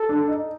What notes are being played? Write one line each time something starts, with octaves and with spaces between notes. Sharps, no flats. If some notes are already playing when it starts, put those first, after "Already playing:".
Already playing: A4
D4
D#4